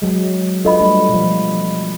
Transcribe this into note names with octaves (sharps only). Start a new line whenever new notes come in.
F#3 G#3
D4 F4 A4 B4 D#5 B5
G3 A3 D4
B2 F3